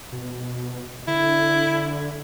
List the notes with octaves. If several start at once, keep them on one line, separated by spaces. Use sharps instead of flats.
B2
D3 E4